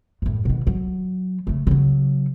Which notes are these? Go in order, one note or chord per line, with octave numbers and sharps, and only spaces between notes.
F#2 A2
B2 D#3
F#3
C#3 A3
C#3 F#3